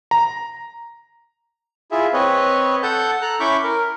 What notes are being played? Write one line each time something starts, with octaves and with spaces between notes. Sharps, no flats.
A#5
E4 F4 G#4 E5
C4 B4 C#5 D#5
A4 F#5 A5 G6
A4 A#5 F#6
C#4 E4 B5 C#6 D6 G6
A#4